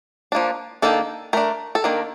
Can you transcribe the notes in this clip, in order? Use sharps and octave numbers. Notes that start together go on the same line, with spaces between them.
F3 A#3 D4
D#3 A#3 D4 A4
A3 D4 A#4
A4
D#3 A#3 D4 A#4